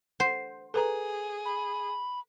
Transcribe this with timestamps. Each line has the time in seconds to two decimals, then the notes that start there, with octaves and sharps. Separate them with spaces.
0.20 C5 F#5
0.74 G#4 A4 B4 A#5
1.45 B5